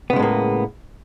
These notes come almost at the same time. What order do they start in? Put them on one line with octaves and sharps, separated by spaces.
B3 C#3 G#3 A2 A#3